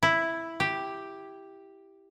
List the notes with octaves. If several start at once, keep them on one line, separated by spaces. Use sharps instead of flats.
E4
G4